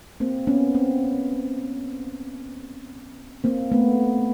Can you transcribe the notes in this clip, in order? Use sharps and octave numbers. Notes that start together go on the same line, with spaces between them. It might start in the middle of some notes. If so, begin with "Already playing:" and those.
A#3 C4
B3 C#4
A#3 C4
A#3 C4
A3 B3